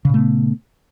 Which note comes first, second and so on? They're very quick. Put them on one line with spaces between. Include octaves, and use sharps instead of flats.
C#3 A#2 A3 B3